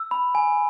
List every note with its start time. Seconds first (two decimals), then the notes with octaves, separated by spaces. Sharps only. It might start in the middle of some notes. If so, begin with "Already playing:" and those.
Already playing: E6
0.11 B5
0.35 G#5